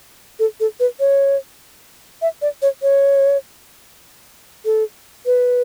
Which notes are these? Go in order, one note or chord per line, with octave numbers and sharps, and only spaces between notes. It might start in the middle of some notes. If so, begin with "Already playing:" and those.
A4
A4
B4
C#5
E5
D5
C#5
C#5
A4
B4